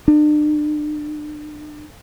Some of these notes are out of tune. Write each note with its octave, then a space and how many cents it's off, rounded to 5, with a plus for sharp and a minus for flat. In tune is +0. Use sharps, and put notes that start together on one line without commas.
D4 +40